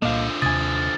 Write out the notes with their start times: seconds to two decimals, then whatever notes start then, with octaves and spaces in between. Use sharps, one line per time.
0.02 C2 A#2 D3 F3 A#3 D#5 F5
0.42 D#2 C3 G#5 D#6 A6